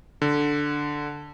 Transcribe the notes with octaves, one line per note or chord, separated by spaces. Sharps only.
D3